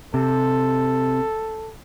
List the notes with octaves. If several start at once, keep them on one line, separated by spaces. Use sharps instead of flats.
C3 A4